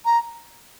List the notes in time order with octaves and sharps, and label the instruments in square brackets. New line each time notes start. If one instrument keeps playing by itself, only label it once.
[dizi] A#5